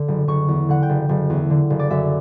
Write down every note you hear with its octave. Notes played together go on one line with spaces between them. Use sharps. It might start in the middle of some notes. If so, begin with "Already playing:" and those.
Already playing: D3
F#1
F#1 C#6
E2
D3 F#5
G5
F#1
F#1
E2
D3
F#1
D5
F#2 E5